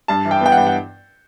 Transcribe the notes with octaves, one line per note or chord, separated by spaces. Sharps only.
G2 A5
E3
G5
B3 G5
F#5
G2
F#5